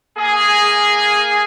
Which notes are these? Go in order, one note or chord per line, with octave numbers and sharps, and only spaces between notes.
A#3 G#4